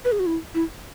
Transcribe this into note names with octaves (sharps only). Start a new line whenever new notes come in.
B4
G#4
F#4
E4
E4